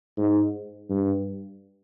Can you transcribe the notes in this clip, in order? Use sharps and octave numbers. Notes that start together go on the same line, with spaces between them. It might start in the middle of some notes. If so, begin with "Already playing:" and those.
G#2
G2